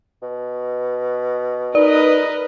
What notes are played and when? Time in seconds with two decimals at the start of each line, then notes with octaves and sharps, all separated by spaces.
0.22 B2
1.75 D#4 A#4 B4 D5 D#5